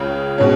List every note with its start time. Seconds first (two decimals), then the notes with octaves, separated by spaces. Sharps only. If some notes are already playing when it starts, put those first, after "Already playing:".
Already playing: C#2 C#3
0.38 B2 G#3 C#4